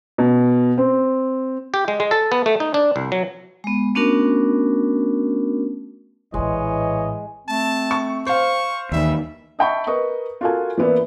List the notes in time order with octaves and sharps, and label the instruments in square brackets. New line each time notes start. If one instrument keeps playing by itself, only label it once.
[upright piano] B2
C4
[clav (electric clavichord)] G4
G#3
G#3
A4
B3
A3
D#4
D4
C2
F#3
[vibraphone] G#3 B3
A3 B3 C#4 D4 F#4 A#4
[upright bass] A#1 A2 [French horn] E3 [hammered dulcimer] G#3 [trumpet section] C#5 D#5 G#5
[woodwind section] A3 C4 [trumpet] A5
[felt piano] C#6
[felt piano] C5 F5 [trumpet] C#6
[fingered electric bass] D#2 D#3 [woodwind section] E3 G3 [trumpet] E5
[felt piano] D#5 E5 G5 A5 B5 C#6
A#4 B4 D#5 C#6
F4 F#4 A4 A#4 F5 G#5
E3 A#3 B3 E4 D5